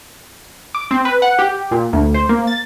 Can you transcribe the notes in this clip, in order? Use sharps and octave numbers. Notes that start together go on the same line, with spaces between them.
D6
C4
B4
F#5
G4
A#2
D2
C5
A#3
A6